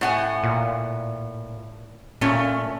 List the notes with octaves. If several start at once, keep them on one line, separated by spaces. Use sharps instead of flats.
A2 F#5 G#5
A#2
A#2 A3 C#4